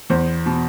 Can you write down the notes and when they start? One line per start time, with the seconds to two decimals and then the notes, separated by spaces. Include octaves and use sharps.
0.10 E2 C5
0.46 B2